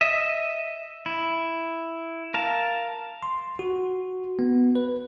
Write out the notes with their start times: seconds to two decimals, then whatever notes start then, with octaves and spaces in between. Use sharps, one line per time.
0.01 D#5 E5
1.06 E4
2.34 A#4 F5 A5
3.23 C6
3.59 F#4
4.39 B3
4.75 B4